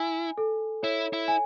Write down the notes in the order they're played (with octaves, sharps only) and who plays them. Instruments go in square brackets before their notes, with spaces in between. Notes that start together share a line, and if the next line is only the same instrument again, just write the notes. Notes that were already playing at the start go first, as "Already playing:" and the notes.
Already playing: [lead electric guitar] E4 [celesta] G#5
[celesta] A4
[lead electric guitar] E4 [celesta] C#5
[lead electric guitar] E4
[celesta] G#5